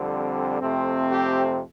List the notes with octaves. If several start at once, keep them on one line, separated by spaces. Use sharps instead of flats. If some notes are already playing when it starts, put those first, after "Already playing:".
Already playing: F2 D3 G3 C4
F2 C3 A3 C4
G4